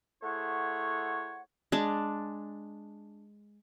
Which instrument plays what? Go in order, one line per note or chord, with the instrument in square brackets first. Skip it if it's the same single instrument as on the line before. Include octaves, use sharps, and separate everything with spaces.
[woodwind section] A3 E4 G#4 C5 C#5 F#5
[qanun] G#3 D4 A5